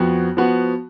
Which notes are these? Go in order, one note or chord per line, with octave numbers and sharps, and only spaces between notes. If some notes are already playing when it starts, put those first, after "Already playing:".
Already playing: F2 F3 B3 F#4
F3 B3 F#4